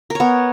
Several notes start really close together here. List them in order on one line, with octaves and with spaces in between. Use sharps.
A#4 C#5 B3